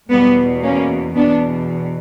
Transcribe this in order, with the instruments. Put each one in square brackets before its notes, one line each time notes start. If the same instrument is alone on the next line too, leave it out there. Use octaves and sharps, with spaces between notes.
[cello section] E2 B2 G3 B3
A#3 C#4
E2 B2 B3 D4